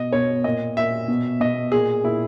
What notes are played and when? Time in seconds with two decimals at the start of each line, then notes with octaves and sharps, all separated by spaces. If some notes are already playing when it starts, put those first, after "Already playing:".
Already playing: B2 D#5
0.13 B2 C#5
0.44 A#2 D#5
0.77 A#2 E5
1.08 B2
1.40 B2 D#5
1.72 A#2 G#4
2.04 A#2 E4